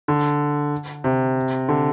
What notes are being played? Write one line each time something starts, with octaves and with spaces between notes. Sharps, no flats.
D3
C3
D3